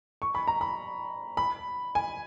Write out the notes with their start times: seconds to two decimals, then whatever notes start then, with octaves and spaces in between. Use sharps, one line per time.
0.22 C#6
0.35 B5
0.48 A#5
0.61 B5
1.37 B5
1.95 G#5